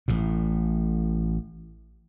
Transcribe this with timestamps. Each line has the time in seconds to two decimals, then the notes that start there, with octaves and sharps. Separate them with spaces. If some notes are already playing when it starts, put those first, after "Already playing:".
0.08 A1 A2